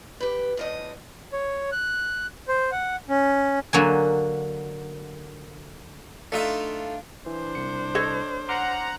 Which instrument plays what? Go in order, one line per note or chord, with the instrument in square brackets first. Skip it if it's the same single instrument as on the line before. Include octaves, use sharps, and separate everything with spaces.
[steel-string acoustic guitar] G4 B4
E2 A2 D#5
[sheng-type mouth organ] C#5
F#6
C5
F#5
C#4
[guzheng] D3 F#3 A#3 G#5
[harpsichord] A3 D#4 E5 [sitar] D4 F4
[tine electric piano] E3 [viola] D4 C5
[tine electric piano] C2 C#7
[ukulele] A4 C#5 D#5
[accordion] F#5 A#5 [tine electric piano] C6 D6 F6